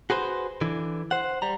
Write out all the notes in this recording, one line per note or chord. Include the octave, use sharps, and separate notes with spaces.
F#4 G#4 B4 C5
D3 E3
C5 F#5
G3 A#5